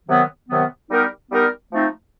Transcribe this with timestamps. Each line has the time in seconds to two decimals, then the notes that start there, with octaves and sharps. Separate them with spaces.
0.08 C3 D#3 F#3 B3
0.49 C3 D#3 F#3 B3
0.90 G3 B3 D#4 G4 A#4
1.31 G3 B3 D#4 G4 A#4
1.72 F3 A3 C4 D#4